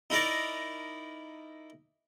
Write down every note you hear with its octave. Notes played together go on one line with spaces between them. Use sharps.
D#4 E4 A#4 D5 A#5